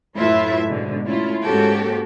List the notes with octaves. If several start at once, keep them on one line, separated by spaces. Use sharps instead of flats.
F#2 A2 E4 F4 B4 E5
G#2 B2 D3
A3 C#4 E4 F4
G#2 A#3 C#4 F#4 G4 A4